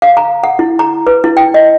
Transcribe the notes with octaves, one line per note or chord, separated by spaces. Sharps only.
F5
A#5
F#5
E4
A#5
B4
E4
G5
D#5